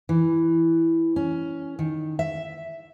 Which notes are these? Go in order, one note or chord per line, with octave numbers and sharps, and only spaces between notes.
E3
C#4
D#3
E5